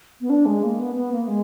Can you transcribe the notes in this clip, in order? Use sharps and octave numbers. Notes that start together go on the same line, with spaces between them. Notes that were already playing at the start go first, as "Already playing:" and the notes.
B3
D4
G#3
A#3
B3
B3
A#3
G#3